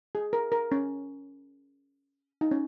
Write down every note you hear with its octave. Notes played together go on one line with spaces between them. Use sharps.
G#4
A#4
A#4
C#4
D#4
C#4